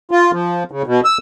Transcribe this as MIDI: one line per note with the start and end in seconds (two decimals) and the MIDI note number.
0.11 0.31 65
0.33 0.63 53
0.71 0.82 49
0.86 1.01 47
1.05 1.18 88